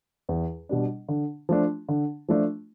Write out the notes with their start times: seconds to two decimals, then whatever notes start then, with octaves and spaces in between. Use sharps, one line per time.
0.29 E2
0.69 B2 G3 D4
1.08 D3
1.49 F3 A3 D4
1.89 D3
2.29 F3 A3 D4